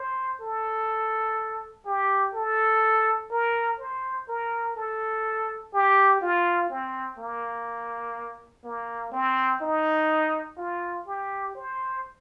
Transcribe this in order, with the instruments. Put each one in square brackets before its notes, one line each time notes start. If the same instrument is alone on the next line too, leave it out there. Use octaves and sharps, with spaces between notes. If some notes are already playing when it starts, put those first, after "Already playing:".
Already playing: [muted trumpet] C5
A4
G4
A4
A#4
C5
A#4
A4
G4
F4
C4
A#3
A#3
C4
D#4
F4
G4
C5